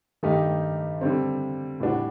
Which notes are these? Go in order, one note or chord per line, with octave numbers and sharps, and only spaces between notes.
G2 D#3 A3 D#4 G4
D3 G3 C4
A2 G3 D4 F#4